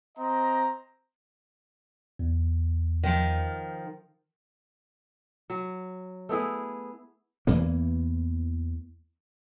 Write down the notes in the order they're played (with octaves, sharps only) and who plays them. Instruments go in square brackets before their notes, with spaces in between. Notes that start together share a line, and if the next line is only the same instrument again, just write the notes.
[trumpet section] C4 D#5 A#5
[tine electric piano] E2
[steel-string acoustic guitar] D#3 F3
[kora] F#3
A3 B3 E4 G#4
[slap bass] E2 E3 A#3